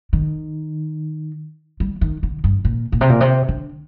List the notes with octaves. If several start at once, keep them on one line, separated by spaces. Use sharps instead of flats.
D#3
G3
D#3
D3
G2
A#2
A#2
C3
A#2
C3
D3